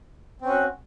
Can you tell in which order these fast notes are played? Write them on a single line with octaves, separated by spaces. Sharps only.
C4 C#4 F#4